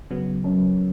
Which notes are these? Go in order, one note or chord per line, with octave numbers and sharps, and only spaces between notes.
C#3 F#3 B3
F#2